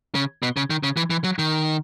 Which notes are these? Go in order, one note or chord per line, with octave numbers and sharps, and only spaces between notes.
C#3
B2
C#3
D#3
C#3
E3
E3
F#3
D#3